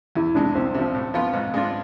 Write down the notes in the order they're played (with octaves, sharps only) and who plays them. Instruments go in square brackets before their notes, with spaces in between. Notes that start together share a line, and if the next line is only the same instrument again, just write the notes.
[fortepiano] E2 [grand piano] E4
[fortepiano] C3 G#3 [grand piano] D4
[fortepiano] C2 [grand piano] C4
[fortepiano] C3 F3
A2
F3 B3 F4
G#2
G#3 D4 F4